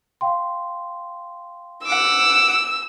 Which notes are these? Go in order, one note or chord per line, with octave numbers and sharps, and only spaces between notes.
F5 G5 C6
F#5 D6 E6